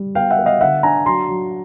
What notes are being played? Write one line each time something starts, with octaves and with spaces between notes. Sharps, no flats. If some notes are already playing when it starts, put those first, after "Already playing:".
Already playing: G3
B3 F5 G5
E5 F#5
B3
D#5 F5
D3 E5 F#5
D4 G#5 A#5
F#3 A#5 C6
F#3